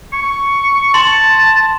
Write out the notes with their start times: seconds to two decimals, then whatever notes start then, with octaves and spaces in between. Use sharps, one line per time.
0.13 C#6
0.94 A5 C6